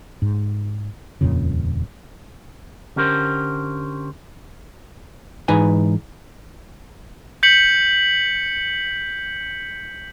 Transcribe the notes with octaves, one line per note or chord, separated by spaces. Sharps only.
G#2
D#1 F2 A#2 C#3
D3 C#4 G4 A#4 C5
G#2 E3 D#4 B4 G#5
G6 B6 C#7 F#7